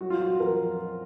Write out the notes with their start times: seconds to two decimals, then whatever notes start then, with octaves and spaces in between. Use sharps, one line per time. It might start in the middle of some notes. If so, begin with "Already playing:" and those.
0.01 F#3 F#4
0.10 F4
0.20 F#4
0.40 F2 A#4